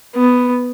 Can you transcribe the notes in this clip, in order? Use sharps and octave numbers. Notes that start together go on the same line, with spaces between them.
B3